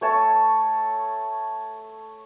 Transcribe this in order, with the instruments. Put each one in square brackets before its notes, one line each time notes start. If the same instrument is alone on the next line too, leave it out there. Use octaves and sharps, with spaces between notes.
[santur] A3 C#5 A5